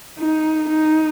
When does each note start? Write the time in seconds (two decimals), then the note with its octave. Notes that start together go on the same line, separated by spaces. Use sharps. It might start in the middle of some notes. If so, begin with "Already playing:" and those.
0.19 D#4
0.69 D#4